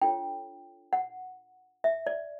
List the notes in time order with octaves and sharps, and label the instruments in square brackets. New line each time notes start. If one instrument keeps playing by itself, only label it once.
[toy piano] D4 F4 A4 C#5 G5
F#5
E5
D5